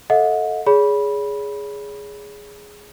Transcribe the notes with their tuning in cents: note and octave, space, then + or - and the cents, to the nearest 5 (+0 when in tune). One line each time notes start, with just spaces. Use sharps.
A4 +0 D#5 +35 F#5 -40
G#4 +0 C#5 +40 B5 -15